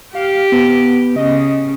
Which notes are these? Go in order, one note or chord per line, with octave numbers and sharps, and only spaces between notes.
G4 F5
B3
C#3 D#5